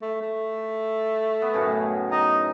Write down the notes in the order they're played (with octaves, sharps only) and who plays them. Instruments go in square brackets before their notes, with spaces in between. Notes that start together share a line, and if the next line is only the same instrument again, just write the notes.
[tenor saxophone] A3
A3
[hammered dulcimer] B3
F#2 A2 C#3
[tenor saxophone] D#4